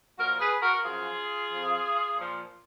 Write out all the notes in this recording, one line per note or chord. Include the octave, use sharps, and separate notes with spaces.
A#2 F3 F#4 A#4
G#4 B4
F#4 A#4
F#2 F3 F4 G#4
F2 F3
A#2 F3